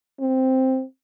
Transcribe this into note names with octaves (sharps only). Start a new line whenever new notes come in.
C4